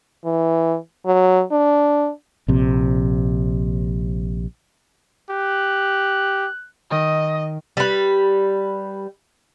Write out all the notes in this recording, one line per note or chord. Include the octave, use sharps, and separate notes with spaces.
E3
F#3
D4
A#1 C3
G4 F#6
D#3 D#5
G3 B4